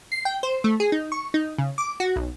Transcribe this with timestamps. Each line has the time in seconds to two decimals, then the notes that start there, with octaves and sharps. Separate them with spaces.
0.12 C7
0.25 G5
0.43 C5
0.64 A3
0.80 G#4
0.92 D#4
1.12 C#6
1.34 D#4
1.58 C#3
1.78 D6
2.00 F#4
2.16 B1